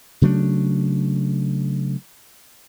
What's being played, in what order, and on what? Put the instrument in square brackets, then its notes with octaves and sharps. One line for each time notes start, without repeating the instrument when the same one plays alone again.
[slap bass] C#3 F#3 A3 D4